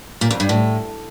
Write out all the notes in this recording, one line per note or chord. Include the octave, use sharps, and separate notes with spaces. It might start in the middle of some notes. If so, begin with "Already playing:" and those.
A#2
F2
G2
A2